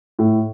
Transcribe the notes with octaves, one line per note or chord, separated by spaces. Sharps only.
A2